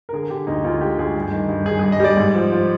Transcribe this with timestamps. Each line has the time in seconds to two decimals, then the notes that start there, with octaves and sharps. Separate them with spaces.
0.09 A#4
0.13 D3 G#4
0.30 D3 G4
0.47 D2 D#4
0.64 D2 F4
0.81 G#3 G4
0.98 D2 G#4
1.16 G2
1.32 D#3
1.49 G2
1.66 G2 G#4
1.79 G2 G#4
1.92 D#5
2.00 G3 D5
2.17 G#2
2.35 F3
2.52 F3